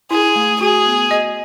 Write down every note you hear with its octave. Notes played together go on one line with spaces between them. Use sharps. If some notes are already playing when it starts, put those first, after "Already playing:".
E4 G#4
A3
F#4 G#4
B3
D#5